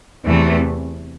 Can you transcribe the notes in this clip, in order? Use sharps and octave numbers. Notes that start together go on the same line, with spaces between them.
E2 C3 E3 A3